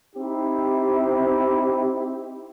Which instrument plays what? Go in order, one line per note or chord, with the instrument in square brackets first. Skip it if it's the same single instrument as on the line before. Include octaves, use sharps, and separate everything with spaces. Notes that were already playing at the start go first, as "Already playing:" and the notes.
[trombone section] C4 D#4 E4 G4